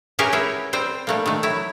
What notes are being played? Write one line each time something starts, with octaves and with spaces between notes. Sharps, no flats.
C#4 E4 G4 G#4 A#4 B4
E4 F#4 C#5
G3 C4 C5 G5
G3 A3 A#3
D#3 A3
F#3 E4